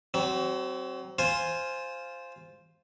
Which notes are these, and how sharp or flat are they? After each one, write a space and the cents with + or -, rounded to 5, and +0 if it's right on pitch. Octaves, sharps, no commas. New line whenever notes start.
F#3 +35 C4 +0
F4 +0 C5 +0 G#5 +0